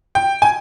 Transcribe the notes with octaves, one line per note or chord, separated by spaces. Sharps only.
G5
G#5